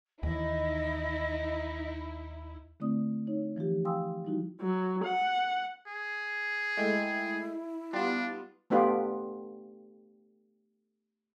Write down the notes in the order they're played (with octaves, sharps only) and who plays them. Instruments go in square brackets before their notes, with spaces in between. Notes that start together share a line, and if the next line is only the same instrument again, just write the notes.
[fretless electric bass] D#2 E3 [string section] D#4 E4 [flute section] D#5
[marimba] D3 A3 C4 E4 D5 D#6
D#4 C#5
E3 F3 F4 G4
F5 G5 G#5 C6 D#6 E6
F3 G3 D#4 E4 F#4
[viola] F#3
F#5
[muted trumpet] G#4
[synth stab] G#3 A3 G5 [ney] E4
[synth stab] G3 B3 F4 [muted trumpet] D4
[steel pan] A3 B3 D4 F4 G4 B4